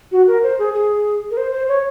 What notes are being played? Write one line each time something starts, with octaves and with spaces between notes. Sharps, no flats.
F#4
A#4
C5
G#4
G#4
A#4
C5
C5
C#5